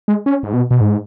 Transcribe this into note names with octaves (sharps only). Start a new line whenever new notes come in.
G#3
C#4
G#2
B2
B2
G#2